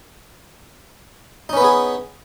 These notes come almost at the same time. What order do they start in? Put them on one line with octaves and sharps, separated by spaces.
D#4 C#4 B4 B3 G#4